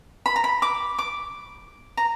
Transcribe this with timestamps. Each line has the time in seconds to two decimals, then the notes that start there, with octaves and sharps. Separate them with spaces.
0.26 B5
0.36 A#5
0.44 B5
0.62 D6
0.99 D6
1.97 A#5